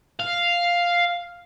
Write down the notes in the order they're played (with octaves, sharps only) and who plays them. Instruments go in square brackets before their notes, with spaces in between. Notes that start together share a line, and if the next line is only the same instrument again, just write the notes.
[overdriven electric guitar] F5